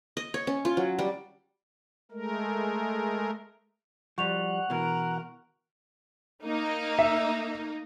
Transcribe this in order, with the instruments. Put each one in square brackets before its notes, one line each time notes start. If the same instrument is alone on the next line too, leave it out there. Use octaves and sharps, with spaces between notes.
[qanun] D#5
C#5
C#4
F4
F#3
G3
[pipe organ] G#3 A3 A#4
[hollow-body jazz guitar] F3 G3 [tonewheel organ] F#5 [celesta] C#6 F7
[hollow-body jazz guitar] B2 E3 [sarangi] A#4
[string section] A#3 D#4
[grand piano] E5